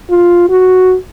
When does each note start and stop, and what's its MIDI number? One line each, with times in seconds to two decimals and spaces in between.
0.10 0.46 65
0.50 0.95 66